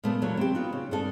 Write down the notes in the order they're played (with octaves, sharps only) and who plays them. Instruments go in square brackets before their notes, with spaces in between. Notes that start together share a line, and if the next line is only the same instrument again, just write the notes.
[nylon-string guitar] A#2 C#3 A3 B3
A#2 E3 F#3 A3 A#3
C4 G4
B3 D#4 F4 F#4
C#3
G2 A#3 C4 D#4 A4 G#5